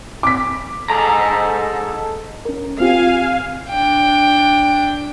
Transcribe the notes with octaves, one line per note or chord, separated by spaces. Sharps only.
D6 B6
G#2 A4 A#5
C#4 A#4
C4 F4 G4 F5 G#5
D4 G5